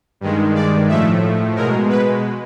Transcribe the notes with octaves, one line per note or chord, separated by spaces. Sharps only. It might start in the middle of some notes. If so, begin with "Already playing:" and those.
G2 D#3 G#3
D5
A2 F3 A3 E5
B2 G#3 A#4
B4